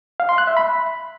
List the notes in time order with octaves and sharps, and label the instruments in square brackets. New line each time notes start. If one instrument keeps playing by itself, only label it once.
[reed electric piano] F5
C6
F#6
E5
B5